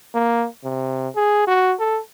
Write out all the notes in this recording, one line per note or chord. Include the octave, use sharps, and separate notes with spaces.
A#3
C3
G#4
F#4
A4